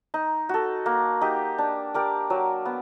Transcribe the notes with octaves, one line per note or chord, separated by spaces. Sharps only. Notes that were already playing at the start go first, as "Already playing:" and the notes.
D#4
F#4 A4
A#3
D#4 G4
D4
G4 A#4 D5
F#3
B3